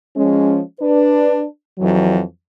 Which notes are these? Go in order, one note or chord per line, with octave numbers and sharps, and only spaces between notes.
F3 G#3 C#4
D4 B4
F2 E3 F#3